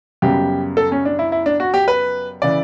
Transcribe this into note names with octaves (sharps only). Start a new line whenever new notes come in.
F#2 C#3 G3 B3 G4
A4
C#4
D4
E4
E4
D4
F#4
G4
B4
C#3 E3 D5